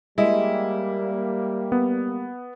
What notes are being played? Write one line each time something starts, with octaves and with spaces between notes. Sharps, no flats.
G3 G#3 A#3 E4
B3